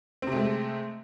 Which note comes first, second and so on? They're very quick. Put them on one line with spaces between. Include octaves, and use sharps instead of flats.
C4 C3 A3 G#3